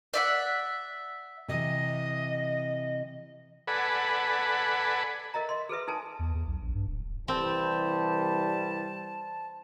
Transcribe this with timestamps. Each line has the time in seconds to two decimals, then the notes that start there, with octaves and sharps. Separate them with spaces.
0.14 D5 E5 F#5
1.48 C3 E3 D#5
3.68 A4 B4 D5 F#5 G#5 B5
5.34 A#4 D#5 E5 A#5
5.49 D#5 C6
5.69 G#4 A4 B4 E5
5.88 D#4 A4 G#5 A5
6.19 E2
6.34 E2
6.47 B1
6.62 A#1
6.75 G2
6.87 D1
7.28 C2 E3 G3 C4 A5